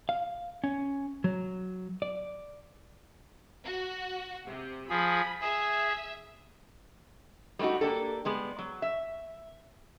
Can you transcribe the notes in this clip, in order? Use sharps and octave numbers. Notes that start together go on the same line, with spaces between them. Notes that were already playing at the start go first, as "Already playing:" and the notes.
F5
C#4
F#3
D5
F#4
C3
F3 G#4 B5
G#4 E5
G3 A3 B3 D#4 F#4
A#3 D4 G4 A4
G3 G#3 B3
F#3
E5